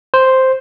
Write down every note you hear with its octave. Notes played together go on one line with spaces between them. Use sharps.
C5